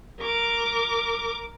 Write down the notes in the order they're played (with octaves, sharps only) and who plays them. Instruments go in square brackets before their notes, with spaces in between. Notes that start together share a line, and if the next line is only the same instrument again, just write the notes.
[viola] A#4 D6